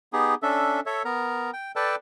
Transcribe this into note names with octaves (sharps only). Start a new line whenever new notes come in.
B3 D#4 G4 G#4
C#4 D4 A4 E5
A4 C#5 E5
B3 A#4 A#5
G5
A4 B4 D5 G5 A5